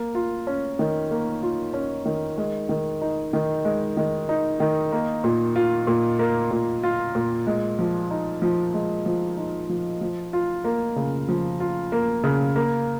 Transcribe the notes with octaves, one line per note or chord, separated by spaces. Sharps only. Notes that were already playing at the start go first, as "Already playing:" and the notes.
Already playing: A#3
F4
C#4
D#3
A#3
F4
C#4
D#3
G#3
D#3
D#4
D#3
G#3
D#3
D#4
D#3
A#3
A#2
F4
A#2
A#3
A#2
F4
A#2
G#3
F3
D#4
F3
G#3
F3
D#4
F3
F3
F4
A#3
C#3
F3
F4
A#3
C#3
A#3